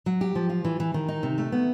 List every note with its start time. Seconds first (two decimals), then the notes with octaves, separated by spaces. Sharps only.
0.06 F#3
0.21 G4
0.35 F3
0.49 F4
0.65 E3
0.80 E3
0.94 D#3
1.08 D#4
1.23 C3
1.38 A3
1.52 B3